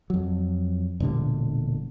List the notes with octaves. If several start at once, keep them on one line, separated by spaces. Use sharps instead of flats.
F2 F#3
E1 A#2 D3 G3